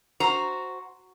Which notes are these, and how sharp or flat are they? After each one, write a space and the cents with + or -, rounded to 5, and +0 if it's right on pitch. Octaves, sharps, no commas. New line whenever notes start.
F#4 +0 C5 +0 A#5 +0